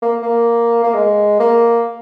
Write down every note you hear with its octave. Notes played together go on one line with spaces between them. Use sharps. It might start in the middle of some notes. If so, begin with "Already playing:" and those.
A#3
A#3
A#3
G#3
A#3